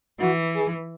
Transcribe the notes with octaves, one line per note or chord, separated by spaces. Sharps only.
E3 F#4
G#4